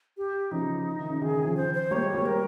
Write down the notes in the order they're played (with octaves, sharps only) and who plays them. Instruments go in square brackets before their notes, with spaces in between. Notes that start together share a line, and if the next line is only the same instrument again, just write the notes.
[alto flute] G4
[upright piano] C#3 F3 [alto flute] D#4
[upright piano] D#3
C#3
[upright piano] D#3 [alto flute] G#4
[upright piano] D#3
C#3 F3
[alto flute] C5
C5
[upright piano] G3 A#3 [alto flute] C#5
[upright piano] G#3 C4
G3 A#3
[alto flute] A#4